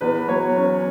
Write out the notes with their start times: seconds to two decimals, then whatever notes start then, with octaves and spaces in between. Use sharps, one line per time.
0.01 E2 B4
0.28 F#3 C#5
0.57 C#4